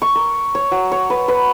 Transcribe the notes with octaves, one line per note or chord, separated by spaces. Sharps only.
C#6
A#4
C#5
F#3
C#5
B4
B4